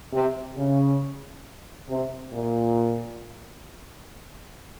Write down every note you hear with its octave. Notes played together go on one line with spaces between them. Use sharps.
C3
C#3
C3
A#2